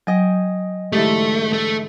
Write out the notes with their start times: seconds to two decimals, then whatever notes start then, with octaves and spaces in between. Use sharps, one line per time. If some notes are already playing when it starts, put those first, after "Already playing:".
0.07 F#3 D#5 G5 G#5
0.92 G#2 D3 E3 A3 G4
1.53 A3